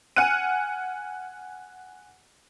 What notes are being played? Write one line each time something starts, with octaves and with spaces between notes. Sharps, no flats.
F#5 G#5 F6 F#6 D#7